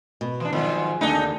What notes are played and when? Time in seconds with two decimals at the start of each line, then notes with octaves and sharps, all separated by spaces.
0.21 B2
0.40 E3 D4
0.53 G#2 D#3 F3 F#3
1.01 D#2 D3 D4 D#4